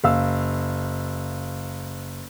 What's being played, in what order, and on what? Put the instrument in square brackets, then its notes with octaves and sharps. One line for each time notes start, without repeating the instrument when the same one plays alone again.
[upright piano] F#1 F5 E6